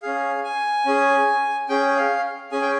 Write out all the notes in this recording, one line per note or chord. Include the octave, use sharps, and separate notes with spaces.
C#4 G#4 F5
G#5
C#4 G#4
C#4 G#4 G5
F5
C#4 G#4 G#5
G5